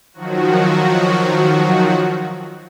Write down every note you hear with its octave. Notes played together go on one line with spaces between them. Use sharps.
D#3 F3 F#3 F#4